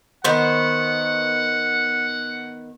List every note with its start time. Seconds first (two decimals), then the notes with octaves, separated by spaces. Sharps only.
0.24 D#3 B3 C5 F#5